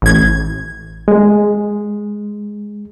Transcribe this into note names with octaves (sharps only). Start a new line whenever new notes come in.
A1 G#6
G#3